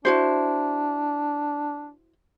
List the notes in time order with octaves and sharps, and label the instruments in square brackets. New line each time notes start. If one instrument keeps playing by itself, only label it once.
[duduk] D4 [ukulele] E4 F#4 C5